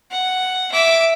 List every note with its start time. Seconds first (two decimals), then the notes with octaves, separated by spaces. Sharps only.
0.11 F#5
0.72 E5 D6